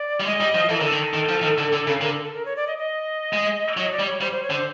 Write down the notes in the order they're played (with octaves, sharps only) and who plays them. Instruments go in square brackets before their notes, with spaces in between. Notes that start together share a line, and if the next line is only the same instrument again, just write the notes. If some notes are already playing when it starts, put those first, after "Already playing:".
Already playing: [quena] D5
[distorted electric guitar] G3
[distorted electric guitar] G#3 [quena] D#5
[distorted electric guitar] G3
F3
[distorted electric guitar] E3 [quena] A4
[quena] A#4
[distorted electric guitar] D3 [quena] A4
[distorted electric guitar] D#3
D#3
F3
D#3
D3
D3
C#3
[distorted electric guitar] D3 [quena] A#4
[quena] A4
A4
A#4
C#5
D5
D#5
D#5
[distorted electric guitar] G#3
[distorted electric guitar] F#3 [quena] D#5
[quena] D5
[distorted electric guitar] G3
[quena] C#5
[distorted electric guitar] G3 [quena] C5
[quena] C5
C#5
[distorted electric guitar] D3
[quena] C5